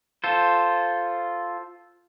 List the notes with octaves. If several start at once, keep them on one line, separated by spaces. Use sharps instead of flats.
F4 A4 C5